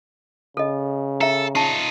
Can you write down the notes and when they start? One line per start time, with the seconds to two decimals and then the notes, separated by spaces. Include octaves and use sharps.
0.57 C#3 A4 D#5
1.21 A4 E5 A#5
1.55 D#4 F4 A5 C#6